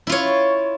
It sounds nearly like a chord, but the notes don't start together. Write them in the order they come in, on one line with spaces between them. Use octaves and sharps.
E4 F4 C#5